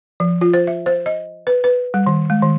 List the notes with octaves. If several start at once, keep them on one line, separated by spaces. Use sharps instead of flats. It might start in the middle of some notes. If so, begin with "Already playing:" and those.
F3
F4
C5
E5
C5
D#5
B4
B4
G3
D#3
G#3
D#3